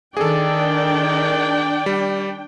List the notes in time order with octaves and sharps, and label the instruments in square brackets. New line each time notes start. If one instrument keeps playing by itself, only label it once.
[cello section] D#3 [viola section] D4 G5 [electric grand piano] G#4 A4 [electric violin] D5
[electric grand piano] G3